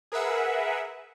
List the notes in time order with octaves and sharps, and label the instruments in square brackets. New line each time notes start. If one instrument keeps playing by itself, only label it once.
[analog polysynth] G#4 A#4 B4 E5 F#5